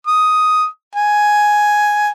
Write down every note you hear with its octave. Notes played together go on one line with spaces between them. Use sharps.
D#6
G#5